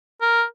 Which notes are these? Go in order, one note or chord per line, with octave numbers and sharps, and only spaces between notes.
A#4